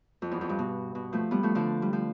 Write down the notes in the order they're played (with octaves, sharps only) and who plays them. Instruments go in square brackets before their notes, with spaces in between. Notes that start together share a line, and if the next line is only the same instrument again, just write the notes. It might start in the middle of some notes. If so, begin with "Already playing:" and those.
[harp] F2
E2
F2
G2
B2
B2
F3 A3
G3 B3
F3 A3
D3 F3
G3
F3